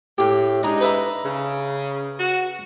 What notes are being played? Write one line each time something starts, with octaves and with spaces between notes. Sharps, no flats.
A2 G4
G#3 D4 D#4 A#5
B4 E5 A#5
C#3
F#4